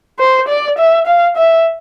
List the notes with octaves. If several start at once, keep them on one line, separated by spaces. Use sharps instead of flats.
C5
D5
E5
F5
E5